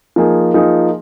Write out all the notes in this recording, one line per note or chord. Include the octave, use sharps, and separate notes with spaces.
F3 A#3 D#4 G#4
F3 A#3 D#4 G#4